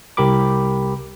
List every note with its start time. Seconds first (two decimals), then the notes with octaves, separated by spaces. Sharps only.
0.17 C2 G4 A#4 B5 D6